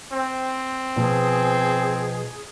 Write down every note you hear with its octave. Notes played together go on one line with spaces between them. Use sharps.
C4
B2 F3 G#4